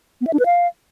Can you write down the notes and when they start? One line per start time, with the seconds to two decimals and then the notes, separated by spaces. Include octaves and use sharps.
0.21 B3
0.27 E5
0.33 D4
0.39 B4
0.46 F5